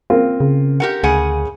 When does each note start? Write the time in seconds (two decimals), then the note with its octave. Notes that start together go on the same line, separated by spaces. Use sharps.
0.10 A#3 C4 F4
0.40 C#3
0.80 G4 A#4 F#5
1.03 D2 C#3 G#4 F#5